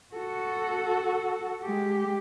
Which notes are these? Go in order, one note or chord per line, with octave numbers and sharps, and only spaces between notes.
F#4 A4
G#3 G4